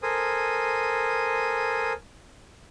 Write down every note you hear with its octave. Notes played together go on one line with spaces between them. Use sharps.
A4 A#4 C5 G#5 D#6